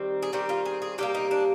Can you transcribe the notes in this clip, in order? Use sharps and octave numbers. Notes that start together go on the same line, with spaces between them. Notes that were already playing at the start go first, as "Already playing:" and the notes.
Already playing: D#3 G3 C4
G#4
D#3 G3 C4 G4
F4
G#4
G#4
C3 G3 A#3 G4
D#4
D4